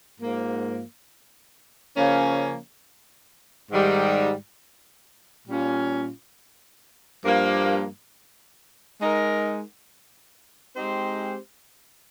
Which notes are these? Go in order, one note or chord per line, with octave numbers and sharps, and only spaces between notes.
G#2 F3 A#3
C#3 F3 A#3 C#4
G#2 D#3 G3
A#2 G3 C#4 F4
G2 F3 A#3
G#3 D#4 A#4
G#3 C4 D#4 G4 C5